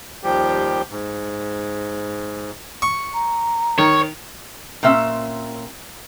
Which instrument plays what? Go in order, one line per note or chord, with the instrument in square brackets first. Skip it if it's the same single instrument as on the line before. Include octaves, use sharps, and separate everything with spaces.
[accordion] D#2 F3 G3 G4
G#2
[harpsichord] C#6
[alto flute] A#5
[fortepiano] D#3 [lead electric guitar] C#5
[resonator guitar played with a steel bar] A#2 C4 C#4 E5